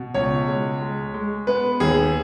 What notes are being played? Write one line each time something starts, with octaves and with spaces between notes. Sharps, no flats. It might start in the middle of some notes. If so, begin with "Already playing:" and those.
Already playing: B2
C#2 C#5
G#3
G#3
G#3
B3 B4
D#2 G#4